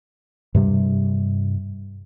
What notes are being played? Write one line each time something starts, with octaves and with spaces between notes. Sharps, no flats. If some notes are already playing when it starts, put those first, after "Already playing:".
G2 C3 G3